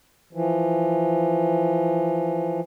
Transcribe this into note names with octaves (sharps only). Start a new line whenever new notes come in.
E3 F3